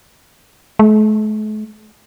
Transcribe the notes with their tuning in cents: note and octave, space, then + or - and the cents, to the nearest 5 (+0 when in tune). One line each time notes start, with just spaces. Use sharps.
A3 -45